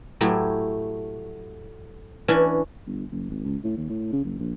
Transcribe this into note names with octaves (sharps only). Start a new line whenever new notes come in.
A2 F#3 A3 E4 G4
E3 C#4 D4
G1
F#1
G#1
C#2
A2
D#2
A2
C#3
F#1
A#1